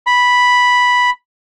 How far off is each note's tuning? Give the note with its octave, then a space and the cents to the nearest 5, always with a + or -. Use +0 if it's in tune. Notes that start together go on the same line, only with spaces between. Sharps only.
B5 -5